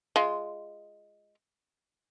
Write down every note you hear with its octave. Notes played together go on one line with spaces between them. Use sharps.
G#3 F4